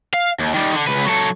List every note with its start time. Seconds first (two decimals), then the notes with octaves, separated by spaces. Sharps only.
0.14 F5
0.39 D#2
0.54 D#3 G3
0.74 D3
0.87 C#2 B4
1.05 F#3 A4